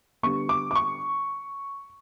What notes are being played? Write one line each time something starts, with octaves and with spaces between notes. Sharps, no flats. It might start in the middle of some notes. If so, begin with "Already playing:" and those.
D3 G3 B3 C#6
D6
D6
C#6